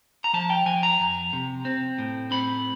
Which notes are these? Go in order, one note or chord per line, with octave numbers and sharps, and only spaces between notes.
A#5
F3 A5
G5
F3 G#5
A#5
F2
C3
C4
A2
C4 B5